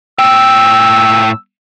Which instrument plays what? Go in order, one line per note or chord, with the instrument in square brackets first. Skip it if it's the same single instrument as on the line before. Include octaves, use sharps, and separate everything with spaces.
[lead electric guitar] A2 G5 [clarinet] E6